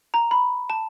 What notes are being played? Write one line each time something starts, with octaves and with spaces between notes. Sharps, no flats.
A#5
B5
A5